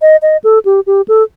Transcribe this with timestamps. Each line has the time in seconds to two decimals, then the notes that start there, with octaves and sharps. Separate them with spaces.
0.02 D#5
0.22 D#5
0.44 A4
0.65 G4
0.87 G4
1.08 A4